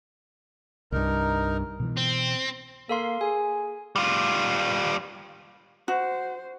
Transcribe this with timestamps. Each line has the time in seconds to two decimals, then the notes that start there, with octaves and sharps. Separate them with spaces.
0.92 C2 G2 D#4 A#4
1.80 B2 E3
1.97 C4
2.89 A#3 A4 F5 C6
3.21 G#4 G#5
3.96 G3 F4
5.88 F#4 C5 F#5